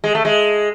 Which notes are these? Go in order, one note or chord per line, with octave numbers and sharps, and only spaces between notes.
G#3
A3
G#3